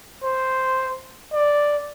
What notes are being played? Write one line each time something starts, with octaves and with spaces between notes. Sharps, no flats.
C5
D5